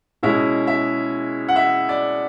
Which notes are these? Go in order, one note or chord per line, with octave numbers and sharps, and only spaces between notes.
B2 G#3 C#4 E4 E5
E5
F#5
E5
D5